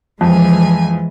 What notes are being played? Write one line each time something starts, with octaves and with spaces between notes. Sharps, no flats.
F2 E3 F3 G#3 G#5